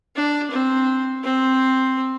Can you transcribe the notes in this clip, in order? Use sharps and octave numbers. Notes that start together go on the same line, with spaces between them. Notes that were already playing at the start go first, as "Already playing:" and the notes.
D4
C4
C4